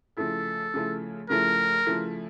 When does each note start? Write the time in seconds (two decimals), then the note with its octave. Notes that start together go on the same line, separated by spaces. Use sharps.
0.17 C#3 F3 A3 E4 A4
0.74 C#3 F3 A3 E4
1.30 C#3 F3 A3 E4 A#4
1.86 C#3 F3 A3 E4